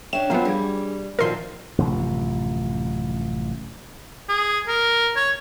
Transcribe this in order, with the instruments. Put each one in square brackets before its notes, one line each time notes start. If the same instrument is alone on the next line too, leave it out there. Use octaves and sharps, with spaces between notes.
[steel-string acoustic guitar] C#4 D4 [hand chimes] C#5 E5 G5 [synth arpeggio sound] E7
[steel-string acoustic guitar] F#2 F3 F#3 [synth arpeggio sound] A#3 B3 [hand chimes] G#5 B5
[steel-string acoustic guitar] G3 [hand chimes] D4 G#4 G#6
[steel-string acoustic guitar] A#2 D#3 F3 [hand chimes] F#4 [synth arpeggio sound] A#4 C6
[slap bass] A1 F#2 C3 F3
[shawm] G#4
A#4
C#5